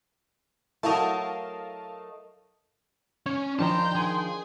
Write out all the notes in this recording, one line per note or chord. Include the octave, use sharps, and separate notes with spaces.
F#3 A3 E4 A#4 D#5 F5 A5
C#4 C#5
D#3 F3 D4 G5 A5 A#5 C6
G#4